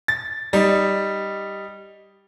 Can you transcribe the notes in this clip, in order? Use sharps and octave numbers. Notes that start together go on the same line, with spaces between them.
A6
G3 D#4